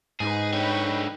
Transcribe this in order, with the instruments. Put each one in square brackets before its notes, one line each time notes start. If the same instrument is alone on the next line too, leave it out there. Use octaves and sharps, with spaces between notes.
[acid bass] G#2 [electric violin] D#4 B4 [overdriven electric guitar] G#4
[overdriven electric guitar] D3 C#5 [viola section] G5 B5